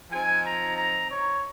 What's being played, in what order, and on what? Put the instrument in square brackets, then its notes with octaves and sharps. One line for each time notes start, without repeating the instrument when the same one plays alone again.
[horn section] F3 C4 D#4 G#5
A#5
A#5
C#5